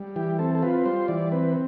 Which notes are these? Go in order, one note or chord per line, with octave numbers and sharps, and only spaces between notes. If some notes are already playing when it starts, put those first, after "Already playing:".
Already playing: G3
E3 G4
C4 A4
A4
F4 B4
G3 C5
E3 D5
C4 B4